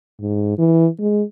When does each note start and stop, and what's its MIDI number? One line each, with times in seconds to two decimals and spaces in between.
0.21 0.58 44
0.58 0.88 52
1.00 1.23 56